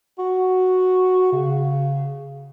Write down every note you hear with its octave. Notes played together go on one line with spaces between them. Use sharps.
F#4
C#3